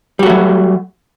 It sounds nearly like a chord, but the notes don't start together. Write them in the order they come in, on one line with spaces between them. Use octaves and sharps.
G3 F#4 A3 F#3